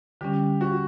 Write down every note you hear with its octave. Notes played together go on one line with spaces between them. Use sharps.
D3 G3 C#4 G4
F#4